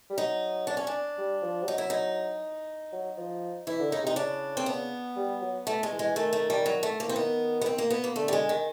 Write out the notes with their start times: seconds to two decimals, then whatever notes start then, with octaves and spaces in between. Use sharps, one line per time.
0.10 G3
0.18 F#3 D#4
0.67 D4
0.77 C#4
0.87 D4
1.18 G3
1.42 F3
1.63 G3
1.67 F#3 D#4
1.78 E4
1.90 D#4
2.92 F#3
3.17 F3
3.67 E3 E4
3.80 D3
3.91 C#3 D#4
4.04 C3 D#4
4.16 C#3 D4
4.57 C4
4.66 B3
5.16 G3
5.41 F#3
5.67 A3
5.83 G#3
5.92 E3
5.99 G#3
6.16 D#3 A3
6.33 A3
6.50 G3
6.66 F#3
6.83 A3
7.00 A#3
7.07 E3 C4
7.16 D#3 B3
7.62 B3
7.66 C4
7.78 A#3
7.91 B3
8.04 A#3
8.16 D3 A3
8.28 G3
8.33 G#3
8.49 D#3